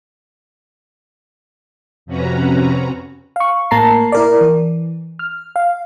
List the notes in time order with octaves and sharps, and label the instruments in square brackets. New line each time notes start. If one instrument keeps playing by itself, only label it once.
[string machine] F2 C3 C#4 F#4 B4 A#5
[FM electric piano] F5 C#6
A2 A#3 A5 A#5 C7
E4 A#4 D5
E3
F6
F5